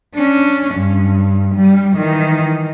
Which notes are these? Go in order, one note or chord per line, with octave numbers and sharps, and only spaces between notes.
C#4 D4
G2
G3
D#3 E3